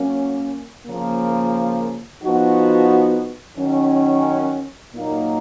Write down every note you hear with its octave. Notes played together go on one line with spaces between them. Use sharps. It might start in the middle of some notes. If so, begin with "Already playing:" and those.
Already playing: F#3 A#3 C#4
C#3 F3 A#3
F3 B3 D#4 F#4
D#3 F#3 C#4
A#2 F#3 A#3 D#4